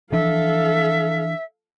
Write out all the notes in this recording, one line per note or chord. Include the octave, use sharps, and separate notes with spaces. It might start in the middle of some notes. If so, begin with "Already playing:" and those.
E3 F3 D4 A4 E5 F5